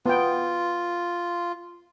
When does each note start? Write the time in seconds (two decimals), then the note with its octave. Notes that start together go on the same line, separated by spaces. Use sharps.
0.06 B3 F4 G5